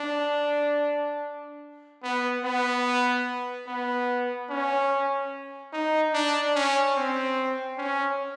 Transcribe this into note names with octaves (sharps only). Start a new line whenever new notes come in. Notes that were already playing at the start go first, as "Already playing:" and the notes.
Already playing: D4
B3
B3
B3
C#4
D#4
D4
C#4
C4
C#4